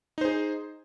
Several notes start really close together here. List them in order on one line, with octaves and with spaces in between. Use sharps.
D#4 C5 G#4